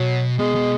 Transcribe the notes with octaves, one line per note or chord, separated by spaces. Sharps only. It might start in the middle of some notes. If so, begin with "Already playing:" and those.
Already playing: B2 F#3
B2 G#3
B2